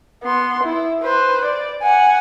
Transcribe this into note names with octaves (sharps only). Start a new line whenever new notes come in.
B3 C6
E4
B4 C5
D5
F#5 G#5